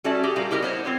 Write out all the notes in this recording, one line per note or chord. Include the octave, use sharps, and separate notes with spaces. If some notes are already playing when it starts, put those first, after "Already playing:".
G3 C#4 F#4 A4 D5 E5
G4 G#4
A#2 G3 A#3
E4 G4 A#4 C#5 D#5
B3 C5 C#5
C4 F4 C#5